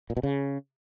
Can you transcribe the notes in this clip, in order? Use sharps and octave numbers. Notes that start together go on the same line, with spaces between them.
A#2
B2
C#3